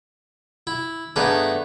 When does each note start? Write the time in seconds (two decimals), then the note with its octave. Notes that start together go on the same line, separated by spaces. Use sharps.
0.67 E4
1.16 G2 A3 B3 D#4 G#4 D5